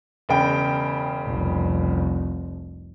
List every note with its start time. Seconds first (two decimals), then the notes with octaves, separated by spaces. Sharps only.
0.29 E1 C#3 G5
1.26 F1 C2